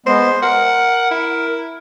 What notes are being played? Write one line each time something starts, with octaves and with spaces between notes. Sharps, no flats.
G#3 B3 C5
A#4 F#5
E4